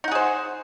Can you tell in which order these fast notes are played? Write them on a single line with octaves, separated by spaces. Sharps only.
D#4 F#5 G#4 C5